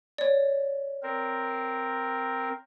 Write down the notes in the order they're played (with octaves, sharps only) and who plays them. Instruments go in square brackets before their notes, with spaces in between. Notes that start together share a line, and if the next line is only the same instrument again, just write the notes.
[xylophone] C#5 D5
[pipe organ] C4 A#4